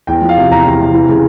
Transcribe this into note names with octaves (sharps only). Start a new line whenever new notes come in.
E2 G5
F3
F5
C3
E2 A#5
E2
C3
E3
C#3